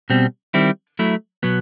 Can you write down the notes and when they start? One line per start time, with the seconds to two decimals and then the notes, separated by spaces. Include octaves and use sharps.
0.10 B2 G3 C4
0.54 D#3 G3 C4 E4
0.99 F#3 A3 E4
1.43 B2 F#3 B3